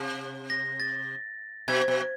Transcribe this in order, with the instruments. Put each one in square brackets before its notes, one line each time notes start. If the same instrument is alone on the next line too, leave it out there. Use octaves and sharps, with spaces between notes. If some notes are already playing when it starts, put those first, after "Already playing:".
Already playing: [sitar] C3
[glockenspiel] A#6
A6
[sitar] B2 [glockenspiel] G#6
[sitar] B2